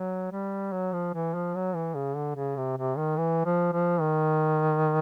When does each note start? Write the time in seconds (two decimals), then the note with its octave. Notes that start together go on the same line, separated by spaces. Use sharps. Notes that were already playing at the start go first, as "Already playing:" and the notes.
Already playing: F#3
0.32 G3
0.72 F#3
0.93 F3
1.14 E3
1.35 F3
1.55 F#3
1.75 E3
1.95 C#3
2.16 D3
2.36 C#3
2.57 C3
2.78 C3
2.97 D#3
3.17 E3
3.45 F3
3.73 F3
4.00 D#3